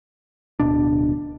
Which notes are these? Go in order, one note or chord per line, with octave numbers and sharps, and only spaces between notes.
D1 B2 D4